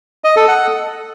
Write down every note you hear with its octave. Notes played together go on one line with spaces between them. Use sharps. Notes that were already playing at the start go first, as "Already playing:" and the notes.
D#5
A4
F#5